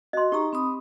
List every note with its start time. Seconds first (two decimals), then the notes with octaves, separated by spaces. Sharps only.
0.13 F#4 D#5 C6
0.32 D#4 G4 A#5 C#6
0.53 C4 B5 D#6